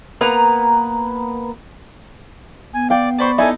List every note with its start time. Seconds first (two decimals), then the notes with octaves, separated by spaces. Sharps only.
0.21 A#3 B3 B4 A#5
2.74 B3 G#5
2.90 D5 F5 G5
3.19 C5 D5 B5 C#6
3.38 D#4 E4 A4 D5 E5 G#5 B5